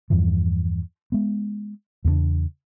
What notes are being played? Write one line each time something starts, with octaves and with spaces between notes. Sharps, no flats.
E2 G2 E3 F3
G#3 B3
E2 C#3 A3 D4